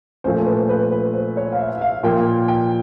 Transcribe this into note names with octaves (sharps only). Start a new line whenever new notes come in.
A#2 F3 A3 C#4 C5
B4
B4
B4
C5
C#5
F5
E5
E5
F5
A#2 F3 A#3 G5
G5